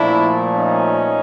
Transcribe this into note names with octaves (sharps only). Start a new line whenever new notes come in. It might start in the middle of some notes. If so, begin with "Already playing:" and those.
Already playing: A#2 F3 A3 D4 E4
C#4 D#4